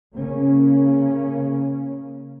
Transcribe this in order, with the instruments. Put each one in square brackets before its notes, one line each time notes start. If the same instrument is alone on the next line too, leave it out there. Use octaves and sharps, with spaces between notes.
[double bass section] C#3 A#3 C#4